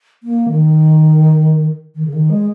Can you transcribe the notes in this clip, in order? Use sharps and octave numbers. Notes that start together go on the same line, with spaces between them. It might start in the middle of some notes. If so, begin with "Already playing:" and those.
A#3
D#3
D#3
C#3
D#3
G#3